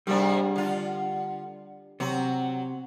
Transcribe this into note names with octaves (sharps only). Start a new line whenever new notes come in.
G#2 C3 G3 A#3 D4
D3 F4
C3 F#3 F#4